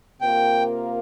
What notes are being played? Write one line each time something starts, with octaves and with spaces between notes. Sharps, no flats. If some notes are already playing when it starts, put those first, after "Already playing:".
C3 A#3 F4 A#4 G5